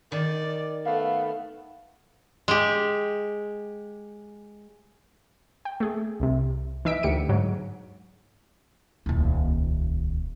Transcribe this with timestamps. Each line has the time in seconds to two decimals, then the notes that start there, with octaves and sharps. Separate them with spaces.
0.12 D#3 D5
0.85 A3 B3 F5
2.48 G#3 G4
5.65 G5
5.80 A3 G#4
6.20 C2 C3
6.85 E3 D#4 E5 B6 D7
7.03 D2 G4 C#7 D7
7.29 G#2 F#3
9.06 D#1 C#2